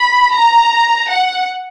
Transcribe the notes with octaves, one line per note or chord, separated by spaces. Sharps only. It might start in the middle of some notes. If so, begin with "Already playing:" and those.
Already playing: B5
A#5
F#5